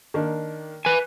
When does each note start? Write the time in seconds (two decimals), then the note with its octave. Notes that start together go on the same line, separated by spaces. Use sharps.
0.14 D#3 A#3 D4
0.85 B4 G#5